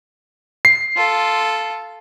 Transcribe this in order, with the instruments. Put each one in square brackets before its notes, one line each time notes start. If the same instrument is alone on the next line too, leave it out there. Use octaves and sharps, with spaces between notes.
[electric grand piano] C7
[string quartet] F4 A4